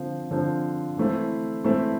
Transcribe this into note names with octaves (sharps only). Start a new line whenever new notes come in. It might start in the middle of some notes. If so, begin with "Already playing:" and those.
Already playing: D3 F3 C4 F4 C5
D3 F3 C4 F4 C5
E3 A3 C4 E4
E3 A3 C4 E4